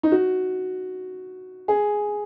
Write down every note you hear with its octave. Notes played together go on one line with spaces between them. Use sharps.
D#4
F#4
G#4